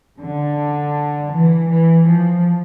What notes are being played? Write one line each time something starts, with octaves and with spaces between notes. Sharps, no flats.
D3
E3
E3
F3